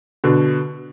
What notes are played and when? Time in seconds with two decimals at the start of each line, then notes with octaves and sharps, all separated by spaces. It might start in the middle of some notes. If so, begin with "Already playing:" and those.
0.24 B2 D3